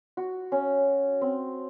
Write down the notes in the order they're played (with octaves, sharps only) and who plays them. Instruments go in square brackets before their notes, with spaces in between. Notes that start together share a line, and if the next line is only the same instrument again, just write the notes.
[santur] F#4
C#4
C4